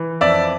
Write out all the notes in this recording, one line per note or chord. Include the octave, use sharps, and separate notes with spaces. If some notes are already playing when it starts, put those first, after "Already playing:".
Already playing: E3
F2 D5 E5